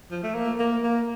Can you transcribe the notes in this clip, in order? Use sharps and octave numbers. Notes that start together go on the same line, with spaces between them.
F3
A3
A#3
A#3
A#3